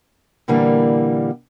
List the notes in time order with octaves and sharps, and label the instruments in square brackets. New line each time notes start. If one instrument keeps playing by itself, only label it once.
[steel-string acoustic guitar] A#2 D3 E3 G3 A#3